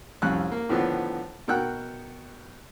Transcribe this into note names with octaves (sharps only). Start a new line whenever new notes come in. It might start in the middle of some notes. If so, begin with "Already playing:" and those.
C2 F2 C#4 F#6
A#3
A2 D3 D#3 F3 B3
B2 A#4 F#5 G5 F#6